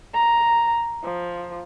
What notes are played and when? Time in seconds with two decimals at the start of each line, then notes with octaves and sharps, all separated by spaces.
0.13 A#5
1.04 F3